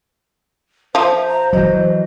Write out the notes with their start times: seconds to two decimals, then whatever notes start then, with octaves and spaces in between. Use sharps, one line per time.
0.95 F3 C5 E5
1.28 A#5
1.53 E3 F#3 D#5